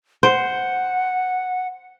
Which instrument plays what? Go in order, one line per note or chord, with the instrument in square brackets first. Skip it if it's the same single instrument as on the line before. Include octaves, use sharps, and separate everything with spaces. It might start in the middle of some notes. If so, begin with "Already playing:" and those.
[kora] C5 [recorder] F#5